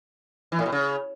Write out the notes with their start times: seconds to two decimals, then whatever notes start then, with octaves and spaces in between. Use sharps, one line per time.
0.52 E3
0.59 A2
0.66 B2
0.72 C#3